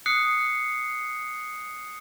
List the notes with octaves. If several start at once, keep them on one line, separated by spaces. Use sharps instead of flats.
D#6 F#6 C7 C#7